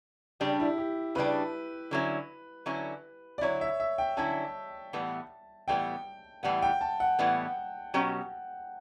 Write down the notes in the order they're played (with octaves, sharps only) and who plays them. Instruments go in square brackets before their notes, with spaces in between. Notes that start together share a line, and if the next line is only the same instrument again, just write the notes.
[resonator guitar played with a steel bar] C#3 G3 D4 [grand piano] G4
[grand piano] E4
G4
[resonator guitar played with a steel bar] C#3 G3 D4 [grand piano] B4
[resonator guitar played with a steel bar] D3 F#3 C#4 E4
D3 F#3 C#4 E4
[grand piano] D5
[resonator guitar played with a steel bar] D3 F#3 C#4 E4 [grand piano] C#5
[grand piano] E5
E5
G5
[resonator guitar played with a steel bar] D3 F#3 C#4 E4 [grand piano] A5
[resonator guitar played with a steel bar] A2 E3 G3 B3
[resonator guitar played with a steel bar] A2 E3 G3 B3 [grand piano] G5
[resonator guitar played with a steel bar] A2 E3 G3 B3 [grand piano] F#5
[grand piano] G5
A5
F#5
[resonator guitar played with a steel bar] A2 E3 G3 B3
B2 F#3 C#4 G4